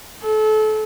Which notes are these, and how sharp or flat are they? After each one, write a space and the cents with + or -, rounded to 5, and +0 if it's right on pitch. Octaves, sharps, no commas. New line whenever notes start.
A4 -30